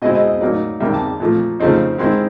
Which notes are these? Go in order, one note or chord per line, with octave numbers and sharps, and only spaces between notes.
B2 G#3 C4 E4 D#5
D#5
D#5
A2 F#3 A#3 D#4 D5
C3 D#3 G3 A#3 E5
A5
A#2 F3 A3
C#3 F3 A3 C4 D#4
D#3 G#3 C4 E4 C6